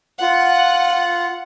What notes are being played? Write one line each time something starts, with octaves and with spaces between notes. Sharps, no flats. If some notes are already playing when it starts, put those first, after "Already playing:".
F4 F#5